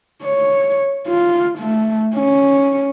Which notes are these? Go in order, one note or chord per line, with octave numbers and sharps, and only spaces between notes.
C#5
F4
A3
C#4